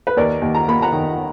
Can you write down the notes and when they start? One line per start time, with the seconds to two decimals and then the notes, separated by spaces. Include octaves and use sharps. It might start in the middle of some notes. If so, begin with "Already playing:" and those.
0.07 B4
0.17 D#2 A#4 D5
0.42 D#2
0.55 A#5
0.68 A#3 B5
0.82 F#5 A#5
0.93 D#3